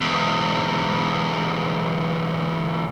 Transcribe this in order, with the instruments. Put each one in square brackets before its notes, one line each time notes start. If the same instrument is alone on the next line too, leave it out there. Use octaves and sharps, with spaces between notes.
[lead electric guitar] E2 G#2